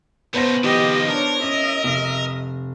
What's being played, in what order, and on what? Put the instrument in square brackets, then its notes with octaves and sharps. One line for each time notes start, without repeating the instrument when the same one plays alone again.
[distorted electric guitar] C#3 A3 [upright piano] B3 C5 A#6
[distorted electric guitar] D#3 F3 [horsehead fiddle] G4 D#5
[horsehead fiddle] D4 C#5 [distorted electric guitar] A#4
[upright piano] C#4 [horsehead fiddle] D#5 E5
[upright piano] F1